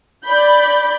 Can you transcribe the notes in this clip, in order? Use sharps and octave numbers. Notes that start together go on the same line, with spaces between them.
D5 B5 G6